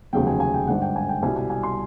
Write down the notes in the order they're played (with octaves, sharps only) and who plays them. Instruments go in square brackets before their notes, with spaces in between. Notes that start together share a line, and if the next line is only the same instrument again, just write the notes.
[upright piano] F1 D#2 C#3 F#3 G5
G#5
G#5
G5
G#1 G2 D3 F#5
G5
G#5
G5
C2 B2 G3 G#5
G#5
G#5
C6